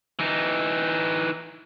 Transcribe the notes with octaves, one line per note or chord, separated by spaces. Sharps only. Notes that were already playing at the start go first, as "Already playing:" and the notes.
E3 D#4